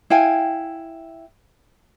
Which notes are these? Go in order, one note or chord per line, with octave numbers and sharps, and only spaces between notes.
E4 F5 G5 G#5